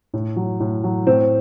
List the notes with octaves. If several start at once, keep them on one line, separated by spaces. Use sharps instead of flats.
A2
F#3
A2
F#3
A2 C4